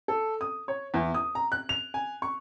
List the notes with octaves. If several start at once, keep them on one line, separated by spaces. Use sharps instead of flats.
A4
D#6
C#5
E2
D#6
A#5
F#6
F7
G#5
C#6